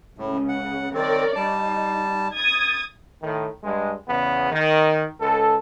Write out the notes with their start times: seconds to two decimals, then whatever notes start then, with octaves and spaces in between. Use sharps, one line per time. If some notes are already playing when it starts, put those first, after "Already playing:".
0.18 C#2 A2 C#3
0.49 F#5
0.94 D#3 C4 A#4 C#5 D5
1.36 G3 D#4 A5
2.34 D#6 G#6 A6
3.21 A2 D#3
3.63 G2 G#3
4.08 E2 C#3 B3
4.50 D#3
5.19 C#2 A4